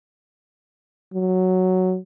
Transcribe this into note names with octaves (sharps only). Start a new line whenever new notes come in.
F#3